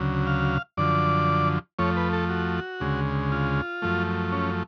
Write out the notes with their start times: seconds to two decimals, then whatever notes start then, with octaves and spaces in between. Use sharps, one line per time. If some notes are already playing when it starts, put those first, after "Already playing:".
Already playing: D2 C#3 F#3
0.27 F5
0.77 F#2 D3 F3 D5
1.79 F2 F3 A3 C#5
1.96 B4
2.13 A4
2.30 F#4
2.80 D2 C#3 G#3
3.32 F4
3.82 F#2 F3 A3
4.32 C#4